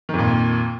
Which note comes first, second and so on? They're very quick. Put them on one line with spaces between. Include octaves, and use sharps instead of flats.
D#3 F2 A#2